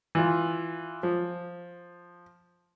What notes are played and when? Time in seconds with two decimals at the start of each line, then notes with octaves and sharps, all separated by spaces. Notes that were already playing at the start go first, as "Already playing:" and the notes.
0.15 E3 F4
1.03 F3